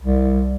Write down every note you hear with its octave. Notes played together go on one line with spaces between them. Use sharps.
C2